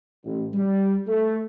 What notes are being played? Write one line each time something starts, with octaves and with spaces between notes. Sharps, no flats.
A1
G3
A3